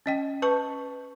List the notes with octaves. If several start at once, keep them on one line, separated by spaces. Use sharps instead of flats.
C#4 D#5 G5
B4 A5 C#6